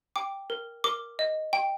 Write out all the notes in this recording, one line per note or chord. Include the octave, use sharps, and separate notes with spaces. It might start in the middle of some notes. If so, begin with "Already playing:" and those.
G5 D6
A#4
A#4 D6
D#5
G5